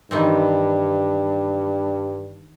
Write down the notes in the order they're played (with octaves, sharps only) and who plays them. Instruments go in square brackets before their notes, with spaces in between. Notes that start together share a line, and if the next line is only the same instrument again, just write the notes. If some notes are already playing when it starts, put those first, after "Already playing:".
[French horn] G2 [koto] D#3 E3 C4